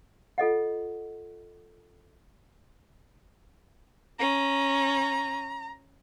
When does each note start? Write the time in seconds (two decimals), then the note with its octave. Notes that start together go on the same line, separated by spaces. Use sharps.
0.38 F4 A4 D#5 F#5
4.19 C#4 A#5